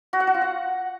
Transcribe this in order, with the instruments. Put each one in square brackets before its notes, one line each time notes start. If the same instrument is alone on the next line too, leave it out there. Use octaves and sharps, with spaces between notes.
[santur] F#4
F#5
F#4
F4
F#5